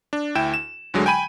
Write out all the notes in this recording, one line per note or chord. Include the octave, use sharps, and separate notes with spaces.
D4
D2 E4 G5 E7
E7
D2 D3 F#3 G#3
G5 G#5 B5 D#7